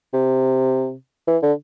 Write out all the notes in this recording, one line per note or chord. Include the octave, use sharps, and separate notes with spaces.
C3
E3
D3